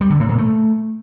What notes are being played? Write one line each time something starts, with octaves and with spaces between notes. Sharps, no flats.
G3
D3
A2
A#2
A3